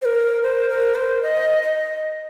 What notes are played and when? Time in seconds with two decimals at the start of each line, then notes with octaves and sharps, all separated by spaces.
0.02 C5
0.05 A#4
0.43 C5
0.69 A#4
0.95 C5
1.23 D#5
1.63 D#5